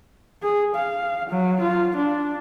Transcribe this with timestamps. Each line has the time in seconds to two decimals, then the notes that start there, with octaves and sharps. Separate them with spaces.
0.43 G#4
0.75 F5
1.30 F#3
1.61 F4
1.96 D4